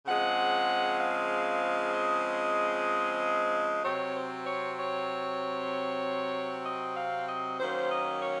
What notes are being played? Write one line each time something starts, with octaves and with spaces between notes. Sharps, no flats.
C#3 F3 G#3 C4 F#5
F5
D#5
C3 F#3 C4 C#5
C5
C#5
C#5
D#5
F5
D#5
D#3 F#3 A#3 C#4 C5
D#5
C#5